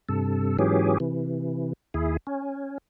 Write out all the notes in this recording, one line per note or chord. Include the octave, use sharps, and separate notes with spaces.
G2 C3 A4
G#2 E3 F#3 C#4 G4 G#4
C3 E3
D#2 E4 G#4
C#4